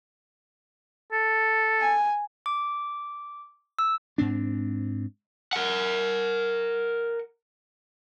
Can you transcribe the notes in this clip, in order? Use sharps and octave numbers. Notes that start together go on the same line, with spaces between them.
A4
G#5
D6
E6
G#2 C4 D4
A#4 F#5